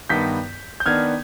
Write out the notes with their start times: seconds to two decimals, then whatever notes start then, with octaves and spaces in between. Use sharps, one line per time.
0.09 G2 D#3 B3 G6 B6
0.80 G6
0.86 D#3 B3 D4 F6 G#6